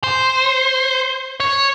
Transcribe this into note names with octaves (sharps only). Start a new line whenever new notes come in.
C5
C#5